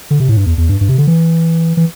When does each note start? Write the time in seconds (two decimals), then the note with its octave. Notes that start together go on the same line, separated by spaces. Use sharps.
0.11 D3
0.20 C3
0.29 A2
0.37 G2
0.46 E2
0.58 E2
0.69 G2
0.81 G2
0.89 C3
0.98 D3
1.07 E3
1.77 E3